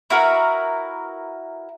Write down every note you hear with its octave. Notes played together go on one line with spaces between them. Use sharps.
E4 F#4 A#4 B4